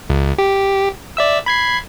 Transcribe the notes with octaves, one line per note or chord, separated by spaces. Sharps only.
C#2
G4
D5 E5 E6
B5 G#6 C7